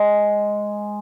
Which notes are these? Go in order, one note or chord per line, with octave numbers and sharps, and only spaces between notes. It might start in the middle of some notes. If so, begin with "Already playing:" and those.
Already playing: G#3